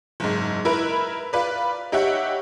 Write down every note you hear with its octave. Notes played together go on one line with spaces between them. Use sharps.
F#1 G#2
E4 A#4 B4
F4 B4 D5
D#4 G4 C#5 E5 F#5